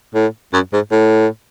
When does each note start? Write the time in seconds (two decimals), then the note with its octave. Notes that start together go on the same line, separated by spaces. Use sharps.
0.14 A2
0.53 F#2
0.73 G#2
0.92 A2